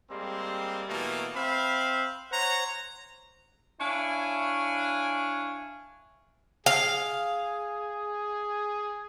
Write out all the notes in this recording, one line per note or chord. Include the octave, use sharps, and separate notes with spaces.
G3 G#3 A#3 C4
B2 E3 A3 A#3
C4 E5 F5 B5
C5 C#5 F#5 A#5
D4 E4 C#5 F5 G#5
G#4 F5